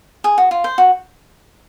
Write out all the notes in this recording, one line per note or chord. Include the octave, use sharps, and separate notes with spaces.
G#4
F#4
F4
C5
F#4